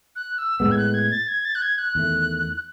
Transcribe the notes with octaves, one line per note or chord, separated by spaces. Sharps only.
F#6
E6
A2 G#3 B3 E6
G#6
F#6
G#6
A6
G#6
A6
F#6
G#6
F#6
E2 D#3 A3